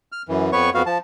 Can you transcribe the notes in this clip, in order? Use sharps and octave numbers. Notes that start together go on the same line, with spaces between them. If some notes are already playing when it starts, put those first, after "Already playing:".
F6
F#2 E3
F2 B3 B4 C#5 C#6
F2 B3 F#4 F5
F3 A5